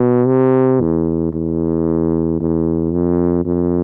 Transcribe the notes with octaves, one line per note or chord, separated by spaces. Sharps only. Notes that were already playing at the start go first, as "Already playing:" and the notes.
Already playing: B2
C3
E2
E2
E2
F2
F2